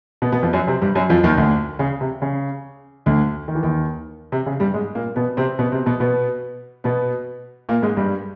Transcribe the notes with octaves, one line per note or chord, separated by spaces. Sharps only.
B2 B3
B2 B3
F2 F3
F#2 F#3
C3 C4
G2 G3
F#2 F#3
F2 F3
D#2 D#3
D2 D3
C#3
C3
C#3
D2 D3
D#3
E3
D#2 D#3
C3
C#3
G2 G3
G#2 G#3
A#2 A#3
B2 B3
C3 C4
B2 B3
C3 C4
B2 B3
B2 B3
B2 B3
A#2 A#3
G#2 G#3
G2 G3